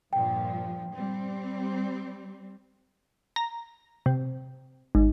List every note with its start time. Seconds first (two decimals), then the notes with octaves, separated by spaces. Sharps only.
0.13 G2 A#2 F3 G5
0.95 G3 C4
3.36 A#5
4.06 C3
4.95 G#1